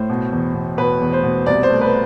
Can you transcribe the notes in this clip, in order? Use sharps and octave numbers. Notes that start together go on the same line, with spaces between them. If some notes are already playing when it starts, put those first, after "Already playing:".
Already playing: A2 C5
B2
E2
B2
B2 B4
E2
C5
B2
C2 D5
C5
A3
B4